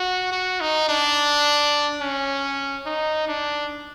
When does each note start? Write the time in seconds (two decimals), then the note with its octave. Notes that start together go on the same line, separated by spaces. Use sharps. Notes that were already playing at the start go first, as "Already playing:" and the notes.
Already playing: F#4
0.32 F#4
0.61 D#4
0.89 D4
2.01 C#4
2.86 D#4
3.28 D4